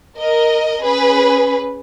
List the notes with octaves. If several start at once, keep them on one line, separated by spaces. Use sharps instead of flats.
A#4 D#5
C#4 G#4 B4